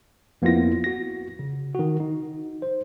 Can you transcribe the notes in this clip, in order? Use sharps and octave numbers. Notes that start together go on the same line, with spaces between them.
F2 A#3 B3 E4 F4 A#6
F#4 A#6
C#3
D#3 F#4
D#4
C5